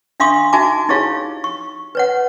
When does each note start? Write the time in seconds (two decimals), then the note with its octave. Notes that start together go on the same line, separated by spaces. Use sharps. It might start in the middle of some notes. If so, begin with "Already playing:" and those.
0.20 D4 E5 F5 C6 C#6 D#6
0.53 D#4 F#4 E5 G#5 A5 D6
0.89 D#4 E4 G4 G#4 C#5 F5
1.44 C#6
1.95 B4 C#5 F#5